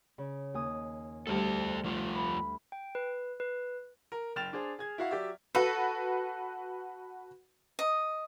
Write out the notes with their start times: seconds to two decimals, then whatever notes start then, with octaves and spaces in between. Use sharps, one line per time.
0.18 C#3
0.54 D#2 G#5 D#6
1.27 D2 G3 G4 A4 C5 A5
1.84 F3 A3 F4
2.15 B5
2.72 G5
2.95 B4
3.40 B4
4.12 A#4
4.36 F#1 G5 F6 A6 E7 F7
4.53 D4 G#4 C5
4.79 G#4 G#6
4.98 E4 F#4 F5
5.11 F#3 G4 D5 E5
5.55 F#4 A4 B4
7.79 D#5